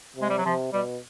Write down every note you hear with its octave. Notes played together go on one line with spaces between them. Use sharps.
C3
G#3
G3
F#3
C3 F3
B2 G3